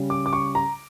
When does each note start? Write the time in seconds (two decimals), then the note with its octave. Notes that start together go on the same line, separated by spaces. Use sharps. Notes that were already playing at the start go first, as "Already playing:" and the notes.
Already playing: C#3 G3 C#4
0.10 D6
0.26 D6
0.33 C#6
0.55 A#5